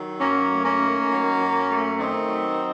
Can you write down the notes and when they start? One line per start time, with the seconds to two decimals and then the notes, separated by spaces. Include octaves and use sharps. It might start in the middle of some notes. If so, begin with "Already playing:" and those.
Already playing: D#3 F#3
0.20 F#2 A#3 C#4
0.50 A3
0.65 A#3 C#4
0.80 D#3
1.11 F#3
1.40 F#2
1.69 A3
1.99 D#3 C4 D#4
2.29 F#3